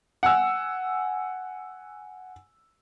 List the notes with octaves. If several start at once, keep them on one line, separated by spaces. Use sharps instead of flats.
F#5 G#5 E6